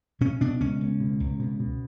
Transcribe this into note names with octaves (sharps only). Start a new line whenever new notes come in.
B2 C#4
B2 D4
C#2 C#4
C#2
B2
C#2
B2
B2